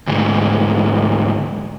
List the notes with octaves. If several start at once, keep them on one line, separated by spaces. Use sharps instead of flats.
D2 G#2